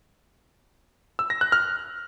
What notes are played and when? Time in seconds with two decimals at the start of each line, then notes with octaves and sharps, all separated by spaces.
1.19 E6
1.30 A#6
1.41 F#6
1.52 F6